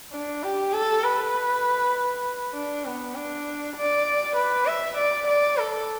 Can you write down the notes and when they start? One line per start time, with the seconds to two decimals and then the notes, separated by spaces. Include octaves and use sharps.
0.12 D4
0.43 G4
0.73 A4
1.04 B4
2.54 D4
2.85 B3
3.15 D4
3.77 D5
4.36 B4
4.66 E5
4.97 D5
5.28 D5
5.58 A4